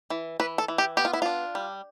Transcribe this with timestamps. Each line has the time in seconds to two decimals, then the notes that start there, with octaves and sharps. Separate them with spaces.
0.10 E3
0.40 E3 B4
0.58 A4
0.68 E3
0.78 G4
0.97 B3 G4
1.05 F4
1.13 E4
1.22 D4 F4
1.55 G3